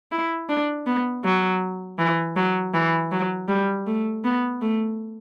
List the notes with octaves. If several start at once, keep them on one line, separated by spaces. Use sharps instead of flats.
E4
D4
B3
F#3
E3
F#3
E3
F#3
G3
A3
B3
A3